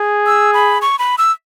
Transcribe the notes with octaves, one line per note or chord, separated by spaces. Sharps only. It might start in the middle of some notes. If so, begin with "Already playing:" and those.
Already playing: G#4
E6
B5
C#6
B5
E6